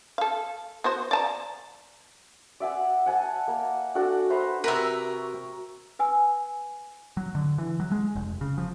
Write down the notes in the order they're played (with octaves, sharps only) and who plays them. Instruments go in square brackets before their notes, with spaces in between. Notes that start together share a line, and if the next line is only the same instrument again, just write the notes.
[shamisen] A4 F5
B3 F#4 C5
D5 A5 A#5
[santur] D5 E5 F#5 G#5
F#5 G#5 A5
A#3
D4 F#4 A4 F#5
B4 C5 E5 A#5
[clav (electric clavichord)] C3 B4 [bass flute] F#4 [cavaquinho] A#4 E5
[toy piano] B4 G#5 E6
[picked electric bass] F#3
D3
E3
F#3
G#3
F1
C#3
F3